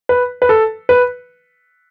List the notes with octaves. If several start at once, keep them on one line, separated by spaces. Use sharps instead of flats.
B4
B4
A4
B4